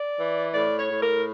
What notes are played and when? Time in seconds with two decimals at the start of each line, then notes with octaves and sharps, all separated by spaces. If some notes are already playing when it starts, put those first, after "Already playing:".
Already playing: D5
0.19 E3
0.54 A2 D5
0.79 C#5
0.90 A2
1.02 A#4